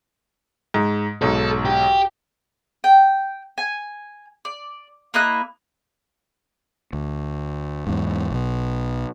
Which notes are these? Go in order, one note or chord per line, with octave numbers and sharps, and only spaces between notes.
G#2
B1 G#2 A4
G4
G5
G#5
D5
A#3 E4 D#5 F#6
D2
E2 G#2
B1 B2